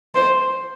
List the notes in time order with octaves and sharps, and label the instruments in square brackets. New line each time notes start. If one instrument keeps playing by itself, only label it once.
[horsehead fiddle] C5